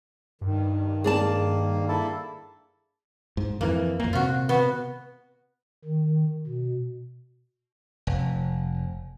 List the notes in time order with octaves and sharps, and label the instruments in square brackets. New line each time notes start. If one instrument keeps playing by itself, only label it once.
[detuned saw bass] G2 [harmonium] D#3
[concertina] A#3 [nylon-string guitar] G#4 D5 A5
[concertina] A#3 E4 A4
[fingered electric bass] G#2
[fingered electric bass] F2 E3 [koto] A#3
[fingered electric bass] F2 A#3 [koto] A#2
[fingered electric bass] C3 [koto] F4 F#4
[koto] B3 F#4
[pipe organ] D#3
B2
[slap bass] F1